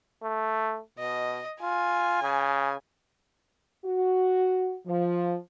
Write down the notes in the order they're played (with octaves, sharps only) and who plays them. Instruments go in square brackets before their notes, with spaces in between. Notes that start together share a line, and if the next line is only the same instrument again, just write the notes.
[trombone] A3
[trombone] B2 [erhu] D#5
[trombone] F4 [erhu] G#5
[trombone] C#3
[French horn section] F#4
F3